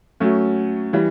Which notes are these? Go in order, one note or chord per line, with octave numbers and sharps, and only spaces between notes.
F#3 A3 C#4
E3 G3